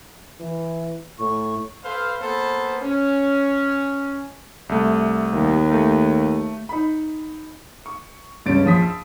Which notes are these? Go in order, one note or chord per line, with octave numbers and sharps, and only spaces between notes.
E3
A2 C#6
A4 B4 C5 F5
A#3 B3 A4 B4 C5
C#4
C2 A3
D#2
A3
D#4 B5
C#6
C#2 G2 C#4 A6 D7
A#1 F3 D#6 B6
E6